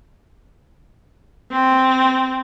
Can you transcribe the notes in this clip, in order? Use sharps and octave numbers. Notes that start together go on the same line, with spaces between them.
C4